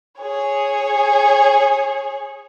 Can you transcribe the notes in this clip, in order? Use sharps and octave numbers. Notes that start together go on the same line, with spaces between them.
G#4 C#5